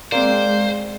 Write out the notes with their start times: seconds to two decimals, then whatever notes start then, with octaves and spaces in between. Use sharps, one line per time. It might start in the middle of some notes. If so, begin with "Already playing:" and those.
0.12 G#3 A#3 C4 G#4 C5 D5